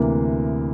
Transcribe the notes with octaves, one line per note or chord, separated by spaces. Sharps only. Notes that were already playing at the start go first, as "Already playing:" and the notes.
Already playing: D2 C3 E3 A#3